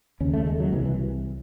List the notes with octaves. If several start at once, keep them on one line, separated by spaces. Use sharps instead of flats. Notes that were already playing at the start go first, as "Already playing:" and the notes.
D#2 C#3 C#4
A3
G#3
F#3
C2 C3 E3
E3